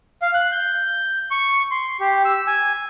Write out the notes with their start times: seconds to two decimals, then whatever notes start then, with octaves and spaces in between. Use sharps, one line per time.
0.22 F5
0.34 F#6
0.52 G6
1.31 C#6
1.71 C6
2.00 G4
2.25 E6
2.47 G#5